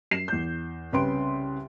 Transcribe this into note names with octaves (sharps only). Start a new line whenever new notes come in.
F#2 C7 E7
E2 G6
C2 C#3 B4 G5 C6 D7